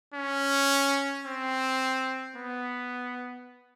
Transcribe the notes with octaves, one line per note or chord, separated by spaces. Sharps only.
C#4
C4
B3